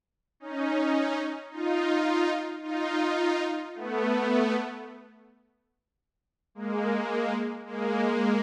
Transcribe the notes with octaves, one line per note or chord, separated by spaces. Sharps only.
C#4 D#4
D#4 F4
D#4 F4
A3 B3
G#3 A#3
G#3 A#3